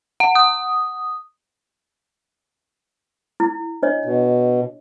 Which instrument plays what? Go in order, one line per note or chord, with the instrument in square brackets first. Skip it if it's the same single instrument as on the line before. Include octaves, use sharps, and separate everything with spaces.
[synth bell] F#5
D#6
[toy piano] E4
D4 C#5 D#5
[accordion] B2